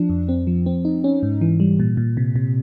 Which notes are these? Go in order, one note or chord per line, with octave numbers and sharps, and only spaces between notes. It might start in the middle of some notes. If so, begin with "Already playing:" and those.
Already playing: F3 D4
F2
C4
F3
C4
D#4
C#4
G#2
E3
G3
A#2
A#2
C3
C3